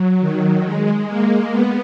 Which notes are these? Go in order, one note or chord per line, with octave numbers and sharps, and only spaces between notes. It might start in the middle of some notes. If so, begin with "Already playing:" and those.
Already playing: F#3
D#3
G#3
A#3
B3